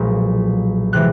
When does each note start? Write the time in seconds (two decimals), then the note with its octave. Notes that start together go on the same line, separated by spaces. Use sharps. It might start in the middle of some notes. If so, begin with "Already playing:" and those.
Already playing: B1 A#2 F3 G#3
0.93 C3 E3 G#3 F#6